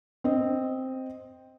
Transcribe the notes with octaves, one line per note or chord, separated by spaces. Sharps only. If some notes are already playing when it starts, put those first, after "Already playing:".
C4 D#5